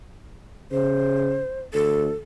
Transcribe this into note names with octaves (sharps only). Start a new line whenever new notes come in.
C#3 C5
D2 A4